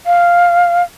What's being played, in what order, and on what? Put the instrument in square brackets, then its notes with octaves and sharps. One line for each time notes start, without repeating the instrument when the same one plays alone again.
[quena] F5